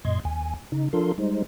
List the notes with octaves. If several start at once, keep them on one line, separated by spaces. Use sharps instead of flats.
F#2 A#2 D#5 C6 G#6
D#2 G#5
C#3 D#4
F3 D4 F4 A4 A#4 C6
G3 G#3 D#4 C5